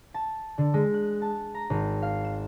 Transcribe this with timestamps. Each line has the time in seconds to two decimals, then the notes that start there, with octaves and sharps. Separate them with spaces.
0.14 A5
0.58 D3
0.74 G#3
0.94 F#6
1.22 A5
1.54 A#5
1.70 G#1
2.02 F5
2.24 E7